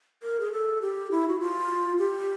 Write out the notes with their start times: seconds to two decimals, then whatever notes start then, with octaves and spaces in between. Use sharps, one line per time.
0.23 A#4
0.40 G#4
0.52 A4
0.82 G4
1.11 E4
1.28 F#4
1.40 F4
1.98 G4